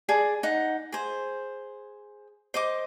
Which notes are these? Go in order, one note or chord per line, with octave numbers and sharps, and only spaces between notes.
G#4 D5 A5
D#4 F#5
G#4 C5
C5 D#5 D6